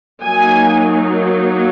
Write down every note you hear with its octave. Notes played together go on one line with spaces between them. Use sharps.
F#3 A#3 D#4 G#5